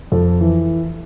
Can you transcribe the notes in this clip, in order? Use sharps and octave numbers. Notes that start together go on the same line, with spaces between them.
F2 A4
E3